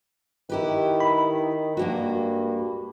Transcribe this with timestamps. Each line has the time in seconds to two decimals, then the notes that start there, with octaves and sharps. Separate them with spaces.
0.49 D#3 E4 G4 B4
1.00 B5
1.77 G2 G#3 A#3 F#4